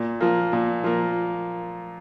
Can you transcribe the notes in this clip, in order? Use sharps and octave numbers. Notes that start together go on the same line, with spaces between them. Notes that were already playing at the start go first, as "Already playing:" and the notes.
Already playing: A#2
F3 A#3
A#2
F3 A#3